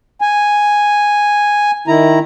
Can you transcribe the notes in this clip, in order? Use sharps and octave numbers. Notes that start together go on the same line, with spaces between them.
G#5
D#3 E4 A#5